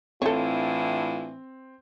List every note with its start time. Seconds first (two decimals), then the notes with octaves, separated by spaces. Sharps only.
0.22 A2 E3 C4 D4 F4 A4 C#5